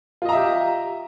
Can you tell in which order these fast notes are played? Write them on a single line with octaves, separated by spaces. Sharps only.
F4 D#5 A#5 E5 G4